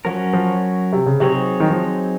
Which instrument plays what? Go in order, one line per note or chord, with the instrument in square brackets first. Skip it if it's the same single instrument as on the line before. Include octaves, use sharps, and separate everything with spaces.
[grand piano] F3 [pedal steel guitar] F#3 C#4 F#4 A#4
[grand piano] F3
C3
C#3
[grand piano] C3 [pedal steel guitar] F#3 C4 D#4 G#4 C#5
[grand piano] D#3
F3